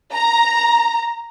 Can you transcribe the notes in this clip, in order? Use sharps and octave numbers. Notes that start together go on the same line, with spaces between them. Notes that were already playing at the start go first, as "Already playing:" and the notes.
A#5